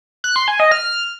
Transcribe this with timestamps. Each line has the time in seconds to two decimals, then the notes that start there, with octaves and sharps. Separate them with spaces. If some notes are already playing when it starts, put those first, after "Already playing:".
0.24 F#6
0.36 C6
0.48 G#5
0.60 D#5
0.71 F6